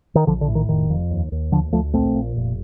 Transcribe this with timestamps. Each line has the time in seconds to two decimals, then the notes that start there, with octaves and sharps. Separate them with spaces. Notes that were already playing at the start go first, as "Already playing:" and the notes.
0.15 D#3
0.27 A#1 D3 F3
0.41 D3
0.48 A2
0.55 D#3
0.69 F1 D#3
0.90 F2
1.11 D#2
1.32 D#2
1.52 D2 D3 F3
1.72 D2 F3 A3
1.94 A#1 A3 C4
2.15 A#2
2.36 F1